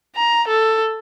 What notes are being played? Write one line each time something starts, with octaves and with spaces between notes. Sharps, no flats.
A#5
A4